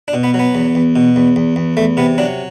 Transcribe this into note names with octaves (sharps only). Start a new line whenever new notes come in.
D4
B2
B3
F#3
B3
E2
E2
B2
E2
E2
E2
E2 A3
C3 B3
F#3 D4